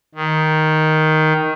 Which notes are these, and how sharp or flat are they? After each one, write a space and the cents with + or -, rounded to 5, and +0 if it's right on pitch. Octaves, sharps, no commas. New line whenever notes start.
D#3 +5